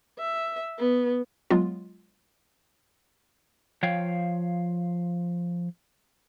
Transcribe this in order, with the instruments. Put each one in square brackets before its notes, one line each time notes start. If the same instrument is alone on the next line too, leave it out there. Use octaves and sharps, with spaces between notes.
[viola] E5
B3
[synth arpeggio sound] F#3 G#3 B3 F4
[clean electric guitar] F3 C#5 F5 G5